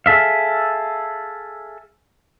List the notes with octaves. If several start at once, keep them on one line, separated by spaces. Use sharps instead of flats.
G#4 A4 E5 F5